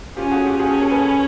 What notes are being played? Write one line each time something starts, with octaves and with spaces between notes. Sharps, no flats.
C#4 F4 G4
F#4 G#4
F4 G4
C#4 F#4 G#4
G4 A4
G#4 A#4
A4 B4